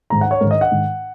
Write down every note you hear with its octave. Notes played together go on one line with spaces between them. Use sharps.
G#2 D#3 A#5
F#5
C#5
G#2 D#3 A#4
D#5
F#5
G#2 D#3